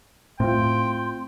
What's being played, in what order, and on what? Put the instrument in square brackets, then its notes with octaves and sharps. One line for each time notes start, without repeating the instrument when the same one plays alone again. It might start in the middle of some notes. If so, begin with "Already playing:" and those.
[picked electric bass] A2 [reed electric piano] C4 F4 [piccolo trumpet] G5 [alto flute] C6